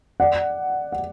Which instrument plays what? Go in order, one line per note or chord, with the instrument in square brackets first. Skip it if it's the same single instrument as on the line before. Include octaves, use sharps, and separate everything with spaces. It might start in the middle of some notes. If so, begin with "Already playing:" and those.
[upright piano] D5 F#5
F#5